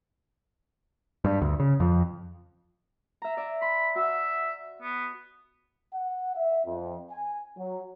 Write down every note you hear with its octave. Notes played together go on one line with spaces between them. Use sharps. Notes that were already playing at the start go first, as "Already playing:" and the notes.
G2
D2
C#3
F2
E5 A#5
D5 E5
B5 C6
F#4 E5
B3
F#5
E5
F2
G#5
F#3